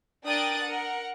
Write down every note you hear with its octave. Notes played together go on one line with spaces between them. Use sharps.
D4 A#4 G5 D#6 F#6 A6
A#4 F#5